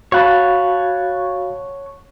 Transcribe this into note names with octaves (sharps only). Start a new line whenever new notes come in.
F#4 C#5 F5 F#5 A5 B5